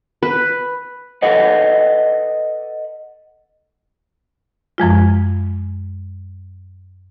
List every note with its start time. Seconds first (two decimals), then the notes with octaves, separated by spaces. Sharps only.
0.23 B4
1.22 A4 B4 D5 D#5 F#5
4.78 F#2 F3 G#3 F4